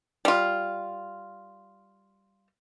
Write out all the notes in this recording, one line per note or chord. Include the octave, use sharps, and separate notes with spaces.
G3 F4